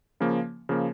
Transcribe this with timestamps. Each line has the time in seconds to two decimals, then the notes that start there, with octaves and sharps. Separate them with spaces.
0.20 C#3 F3 A#3
0.69 C#3 F3 A#3